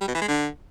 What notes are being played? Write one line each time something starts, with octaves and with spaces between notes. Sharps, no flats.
G3
B2
E3
G#3
D3